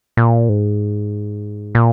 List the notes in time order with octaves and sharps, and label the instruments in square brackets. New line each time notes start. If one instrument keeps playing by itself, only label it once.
[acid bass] A#2
G#2
A#2